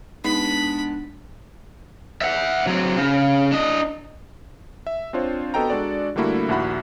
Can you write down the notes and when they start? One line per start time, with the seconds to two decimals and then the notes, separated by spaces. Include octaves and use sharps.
0.24 G#3 B3 D4 D#4 B5
2.21 E5 F#5
2.67 F#3 C4
2.97 C#3
3.52 D4 D#5
4.87 E5
5.13 C4 D4 F4 C5 C#5
5.54 B3 F#4 A4 D#5 G5 A#5
5.70 G#3 D4 F#4 A4 D5
6.16 D3 G3 A3 A#3 E4 F#4
6.49 A#1 D#2 E4 F#4 F#5 B5